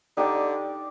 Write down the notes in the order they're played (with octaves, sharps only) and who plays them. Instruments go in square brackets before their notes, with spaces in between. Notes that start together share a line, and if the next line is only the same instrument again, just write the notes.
[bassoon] D3 [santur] D#4 G4 D5